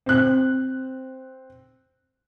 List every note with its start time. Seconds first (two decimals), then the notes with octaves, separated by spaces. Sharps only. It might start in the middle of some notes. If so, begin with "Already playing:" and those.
0.06 C4 F#6